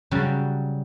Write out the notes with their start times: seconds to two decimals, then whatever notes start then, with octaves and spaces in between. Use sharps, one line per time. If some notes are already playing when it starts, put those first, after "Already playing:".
0.11 C#3 F#3 G3